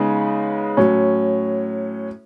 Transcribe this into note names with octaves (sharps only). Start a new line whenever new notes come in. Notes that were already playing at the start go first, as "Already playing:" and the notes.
Already playing: C#3 G#3 B3 D#4
A2 F#3 C#4